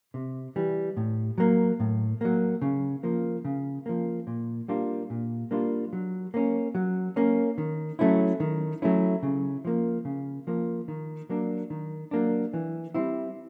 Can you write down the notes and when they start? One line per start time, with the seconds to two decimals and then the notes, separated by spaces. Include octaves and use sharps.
0.14 C3
0.56 E3 G3
0.97 A2
1.38 F#3 A#3
1.80 A2
2.21 F#3 A#3
2.62 C#3
3.03 F3 A#3
3.45 C#3
3.86 F3 A#3
4.27 A#2
4.68 G3 A#3 D4 F4
5.10 A#2
5.51 G3 A#3 D4 F4
5.93 F#3
6.34 A#3 C#4
6.75 F#3
7.16 A#3 C#4
7.58 D#3
7.99 F#3 A3 C#4 E4
8.40 D#3
8.82 F#3 A3 C#4 E4
9.23 C#3
9.65 F3 A#3
10.05 C#3
10.47 F3 A#3
10.88 D#3
11.29 F#3 A#3 D4
11.70 D#3
12.11 F#3 A#3 D4
12.53 E3
12.94 G3 C4 E4